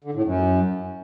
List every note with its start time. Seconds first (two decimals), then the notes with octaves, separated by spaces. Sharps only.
0.04 D3
0.14 A2
0.24 F#2